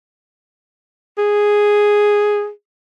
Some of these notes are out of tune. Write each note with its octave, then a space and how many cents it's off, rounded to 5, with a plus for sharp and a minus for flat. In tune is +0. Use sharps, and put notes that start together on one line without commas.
G#4 +0